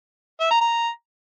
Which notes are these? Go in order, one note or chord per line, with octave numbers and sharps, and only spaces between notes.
E5
A#5
A#5